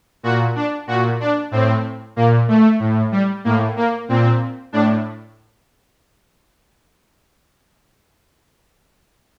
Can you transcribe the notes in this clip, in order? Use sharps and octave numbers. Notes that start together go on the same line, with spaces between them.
A#2 F#4
D4
A#2 F#4
D4
A2 C4
A#2 A#3
A3
A2
G3
A2 A#3
A#3
A#2 C4
A2 D4